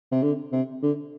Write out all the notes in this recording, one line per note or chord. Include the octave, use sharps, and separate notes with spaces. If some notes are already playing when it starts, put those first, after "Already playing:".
C3
D3
C3
D3